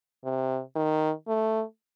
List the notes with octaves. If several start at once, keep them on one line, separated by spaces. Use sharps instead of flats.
C3
D#3
A3